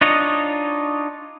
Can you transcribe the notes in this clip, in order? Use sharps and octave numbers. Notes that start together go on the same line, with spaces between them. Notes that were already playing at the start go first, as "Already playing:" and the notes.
D4 D#4 F4 C#5 D#5